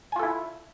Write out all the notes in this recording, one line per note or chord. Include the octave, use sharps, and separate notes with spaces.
E4 F4 A4 G#5